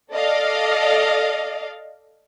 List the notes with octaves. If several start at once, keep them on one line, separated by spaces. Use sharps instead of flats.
A4 D5 D#5 F5